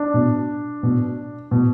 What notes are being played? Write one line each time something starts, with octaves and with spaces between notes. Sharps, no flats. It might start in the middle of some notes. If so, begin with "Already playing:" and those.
Already playing: D4
B2
B2
B2